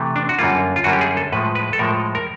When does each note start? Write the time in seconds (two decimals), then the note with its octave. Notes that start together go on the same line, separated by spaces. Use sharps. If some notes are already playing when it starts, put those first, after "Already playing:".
Already playing: C3 E3 A3
0.16 D4
0.29 F#4
0.38 F#2 D3 G3 A#3 F4
0.76 F4
0.84 F#2 D3 G3 A#3 F#4
0.93 G4
1.01 G#4
1.17 A4
1.32 A2 F3 G#3 B4
1.55 B4
1.73 A4
1.79 A2 F3 G#3 A#4
2.15 A#4